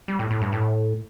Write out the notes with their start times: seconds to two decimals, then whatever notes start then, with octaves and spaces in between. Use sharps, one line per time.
0.08 G3
0.19 A2
0.31 A2
0.41 G2
0.52 A2